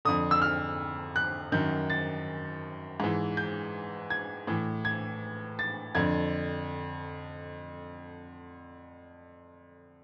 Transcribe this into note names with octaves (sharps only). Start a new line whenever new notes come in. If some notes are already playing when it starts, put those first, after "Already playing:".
F2 D3 D#6
E6
F6
F#6
F#2 D#3 G6
A6
G#2 E3
G6
G#6
A2 E3
G#6
A6
F2 D3 G#6